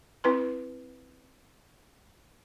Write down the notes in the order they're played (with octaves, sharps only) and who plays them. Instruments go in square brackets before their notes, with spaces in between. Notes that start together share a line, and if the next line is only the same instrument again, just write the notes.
[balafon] C4 E4 B4 C6